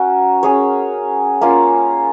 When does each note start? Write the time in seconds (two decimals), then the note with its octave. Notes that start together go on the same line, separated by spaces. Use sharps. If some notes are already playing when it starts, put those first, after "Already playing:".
Already playing: C#4 F#4 A#4
0.43 C#4 G#4 C#5
1.41 A#3 C#4 F4